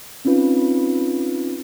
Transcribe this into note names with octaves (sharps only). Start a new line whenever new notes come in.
C4 C#4 D#4 F4 B4